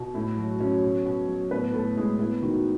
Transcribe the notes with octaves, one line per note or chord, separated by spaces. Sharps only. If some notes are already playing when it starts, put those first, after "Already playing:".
Already playing: B2
A2 E4
F#3 F#4
F#3 C#4 C#5
B2
B2
F#3
A2 B3 B4
A2 A3 A4
A2 G#3 G#4
B3 E4
D#3 F#4